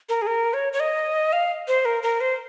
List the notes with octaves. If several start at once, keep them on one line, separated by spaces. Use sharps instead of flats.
A#4
G#4
A#4
C#5
C#5
D#5
F5
C5
A#4
A#4
C5